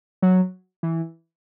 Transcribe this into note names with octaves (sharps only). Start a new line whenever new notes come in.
F#3
E3